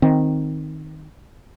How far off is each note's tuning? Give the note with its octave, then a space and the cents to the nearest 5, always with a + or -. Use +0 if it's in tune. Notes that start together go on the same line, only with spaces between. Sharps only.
D#3 +0 C4 +0